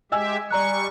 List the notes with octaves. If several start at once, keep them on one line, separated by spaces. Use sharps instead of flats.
G#3 G4 D#5 E5 G#5 E6
G3 D5 A#5 C#6 F#6